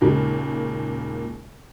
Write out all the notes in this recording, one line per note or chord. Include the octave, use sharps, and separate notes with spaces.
D#2 A#2 C#3 G#3